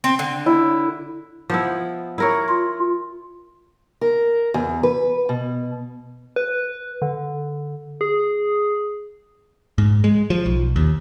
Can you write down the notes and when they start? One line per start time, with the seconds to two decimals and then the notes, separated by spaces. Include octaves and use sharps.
0.04 C4
0.19 D3
0.46 E4
1.50 F3 B3 E4
2.18 E4 A#4 C#5
2.49 F4
4.01 A#4
4.54 E2
4.83 B4
5.29 B2
6.36 B4
7.02 D3
8.01 G#4
9.78 G#2
10.04 G#3
10.30 F3
10.46 B1
10.76 D#2